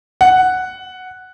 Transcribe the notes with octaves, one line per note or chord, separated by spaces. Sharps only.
F#5